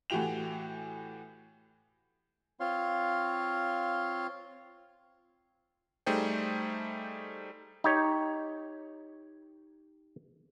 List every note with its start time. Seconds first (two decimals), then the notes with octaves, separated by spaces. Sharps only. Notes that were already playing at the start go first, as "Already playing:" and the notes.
0.10 A2 E3 F#4 G4 G5 F7
2.60 C4 F4 C#5 F5 C6
6.06 G3 A3 D#4 G#4 C5 G5
7.84 D#4 G4 C#5